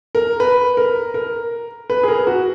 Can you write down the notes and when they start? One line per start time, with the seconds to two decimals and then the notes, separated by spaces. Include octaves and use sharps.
0.15 A#4
0.40 B4
0.77 A#4
1.14 A#4
1.90 B4
2.03 G#4
2.08 A#4
2.27 F#4